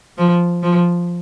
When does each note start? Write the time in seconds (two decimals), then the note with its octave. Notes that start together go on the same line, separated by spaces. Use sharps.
0.18 F3
0.63 F3